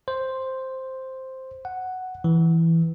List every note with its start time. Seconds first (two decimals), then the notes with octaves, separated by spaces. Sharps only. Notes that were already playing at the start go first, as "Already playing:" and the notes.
0.08 C5
1.65 F#5
2.24 E3